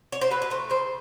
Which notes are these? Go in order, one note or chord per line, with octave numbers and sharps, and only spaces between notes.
C#5
C5
F#3 B4
B4
A3 C5
C#3 C5